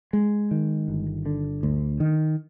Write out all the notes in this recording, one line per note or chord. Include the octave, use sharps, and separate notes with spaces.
G#3
D#3
G1
D3
D2
D#3